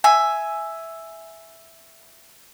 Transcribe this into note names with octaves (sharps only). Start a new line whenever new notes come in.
E5 G#5